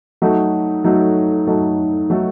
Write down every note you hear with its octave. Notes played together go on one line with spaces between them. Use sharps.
F#3 A3 D#4 F#4 A4
F#3 A3 D#4 F#4 A4
F#3 A3 D#4 F#4 A4
F#3 A3 D#4 F#4 A4